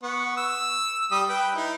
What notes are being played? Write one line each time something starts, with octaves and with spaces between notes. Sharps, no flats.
B3 F#5 C#6
E6
G3 D#6
B4 G5
D#4 E4